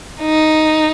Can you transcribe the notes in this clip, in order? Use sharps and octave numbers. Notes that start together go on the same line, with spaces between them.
D#4